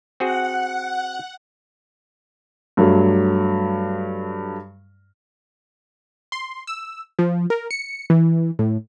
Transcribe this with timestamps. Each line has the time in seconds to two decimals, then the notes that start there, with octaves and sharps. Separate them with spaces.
0.20 C4 F#4 G#4 F#5
2.77 G2 F#3 A3
6.32 C6
6.67 E6
7.19 F3
7.50 A#4
7.71 C#7
8.10 E3
8.59 A2